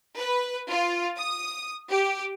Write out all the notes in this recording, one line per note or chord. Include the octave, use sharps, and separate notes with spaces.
B4
F4
D#6
G4